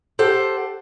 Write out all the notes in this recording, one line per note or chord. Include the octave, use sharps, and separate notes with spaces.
G4 A4 C5 F#5